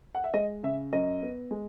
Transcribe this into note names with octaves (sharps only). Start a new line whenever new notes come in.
F#5
E5
G#3 D#5
C#3 E5
F#2 D#5
B3
G#3